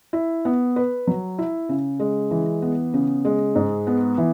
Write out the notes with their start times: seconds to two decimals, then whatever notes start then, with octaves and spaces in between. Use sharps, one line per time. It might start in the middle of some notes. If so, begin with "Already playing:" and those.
0.13 E4
0.45 B3
0.76 B4
1.07 F#3
1.38 E4
1.69 C#3
2.00 G#3
2.31 E3
2.62 B3
2.94 C#3
3.25 G#3
3.55 G#2
3.87 B3
4.18 E3